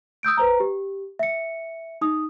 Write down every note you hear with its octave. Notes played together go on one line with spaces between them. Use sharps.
D#6 E6 G6 D7
B4 C5 A#5
G4
E5 C#7
D#4 D#6